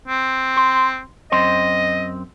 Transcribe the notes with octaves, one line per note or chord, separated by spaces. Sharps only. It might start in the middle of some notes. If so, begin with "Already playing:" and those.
C4
C6
F#2 C4 D#5 C6